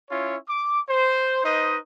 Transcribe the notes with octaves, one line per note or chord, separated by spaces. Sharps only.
C#4 E4 F4 C#5
D6
C5
D#4 B4 C5 D#5